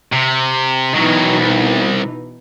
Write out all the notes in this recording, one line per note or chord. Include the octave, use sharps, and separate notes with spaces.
C3
B2 D#3 E3 F#3 D#4
C2